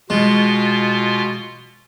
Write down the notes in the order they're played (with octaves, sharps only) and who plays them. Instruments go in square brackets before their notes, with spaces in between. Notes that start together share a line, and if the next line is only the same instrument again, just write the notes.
[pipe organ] B2 F4 [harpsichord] G#3